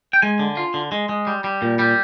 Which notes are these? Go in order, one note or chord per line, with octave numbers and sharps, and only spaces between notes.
G5
G#3 G#5
D3
F4
D3
G#3
G#3
G3
G3
A#2
G3